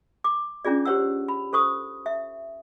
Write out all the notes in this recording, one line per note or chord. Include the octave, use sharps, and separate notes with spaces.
D6
C#4 D4 F4 G#4 D5
G4 C5 C#5 F#5 E6
B5
A4 C5 C#6 D#6
E5